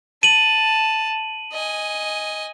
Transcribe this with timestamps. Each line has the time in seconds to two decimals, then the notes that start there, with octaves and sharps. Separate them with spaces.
0.23 A5 D#7 F#7
1.53 D#5 G#5